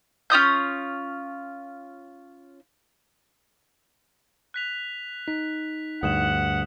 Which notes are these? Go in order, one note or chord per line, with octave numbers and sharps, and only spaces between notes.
C#4 F4 D#6 G6
F#6 B6 F7
D#4 B6
D2 G2 F#5 D#6 E7 F#7